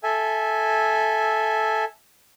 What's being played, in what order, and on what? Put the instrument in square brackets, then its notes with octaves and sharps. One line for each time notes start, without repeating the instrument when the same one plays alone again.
[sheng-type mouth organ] A4 E5 G#5